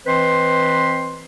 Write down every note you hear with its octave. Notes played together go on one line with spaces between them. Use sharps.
E3 C4 B4 C5 D#5 C6